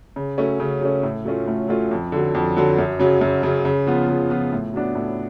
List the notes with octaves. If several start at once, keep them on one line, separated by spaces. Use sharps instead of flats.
C#3
F#3 A3 C#4
C#3
F#3 A3 C#4
A2
F#3 A3 C#4 F4
A2
F#3 A3 C#4 F4
F2
D3 F#3
F2
D3 F#3
F#2
C#3 F#3
F#2
C#3 F#3
C#3
F3 B3 F4
C#3
F3 B3 F4
A2
F#3 B3 D4
A2